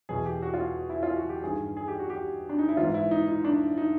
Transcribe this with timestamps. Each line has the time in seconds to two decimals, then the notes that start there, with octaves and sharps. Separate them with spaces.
0.09 E2 B2 G#4
0.26 G4
0.42 F#4
0.54 F4
0.60 F#4
0.90 E4
1.03 F4
1.16 F#4
1.29 G4
1.43 G2 D#3 G#4
1.77 G#4
1.88 G4
1.99 F#4
2.10 G4
2.49 D4
2.59 D#4
2.68 E4
2.77 G#2 E3 F4
2.94 E4
3.11 D#4
3.27 D#4
3.44 D4
3.78 D#4